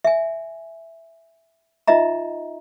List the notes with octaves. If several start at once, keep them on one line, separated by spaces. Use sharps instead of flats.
E5 G#5
D#4 F4 D#5 E5 A#5